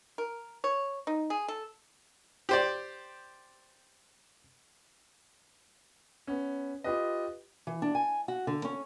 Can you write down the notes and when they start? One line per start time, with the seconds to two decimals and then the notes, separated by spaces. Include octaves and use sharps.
0.18 A#4
0.64 C#5
1.07 D#4
1.30 G#4
1.48 A4
2.49 G4 C5 D5
6.27 B3 C#4
6.84 F4 G4 B4 D#5
7.67 E3
7.82 D4
7.95 G#5
8.28 F#4
8.47 D3
8.65 C#4